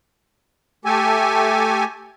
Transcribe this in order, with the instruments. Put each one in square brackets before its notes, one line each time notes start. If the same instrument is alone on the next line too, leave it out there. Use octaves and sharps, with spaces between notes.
[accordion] A3 G4 A4 G#5